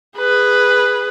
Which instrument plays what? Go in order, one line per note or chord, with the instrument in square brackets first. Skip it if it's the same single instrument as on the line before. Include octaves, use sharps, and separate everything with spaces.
[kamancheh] G#4 B4